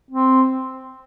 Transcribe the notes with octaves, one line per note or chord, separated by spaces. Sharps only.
C4